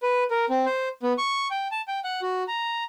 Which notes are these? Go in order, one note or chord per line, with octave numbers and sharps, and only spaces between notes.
B4
A#4
C4
C5
B3
C#6
G5
A5
G5
F#5
F#4
A#5